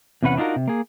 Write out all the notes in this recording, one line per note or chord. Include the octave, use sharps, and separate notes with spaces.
E2 C3 C#4 B4 F#5
D4 D#4 F4 F#4 A#4
C3
A#3 G#4